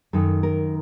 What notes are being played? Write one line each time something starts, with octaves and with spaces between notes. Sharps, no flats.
F#2 D#3 A4
A#4